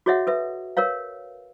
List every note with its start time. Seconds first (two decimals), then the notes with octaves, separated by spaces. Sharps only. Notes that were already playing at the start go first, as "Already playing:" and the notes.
0.06 F#4 G#4 C#5 D#5 E5 F#5
0.27 A4 B4 E5
0.77 A#4 B4 C#5 F5